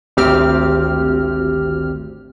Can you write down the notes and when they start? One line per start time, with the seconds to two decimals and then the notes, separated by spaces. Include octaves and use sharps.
0.17 G#1 D2 C4 G4 F6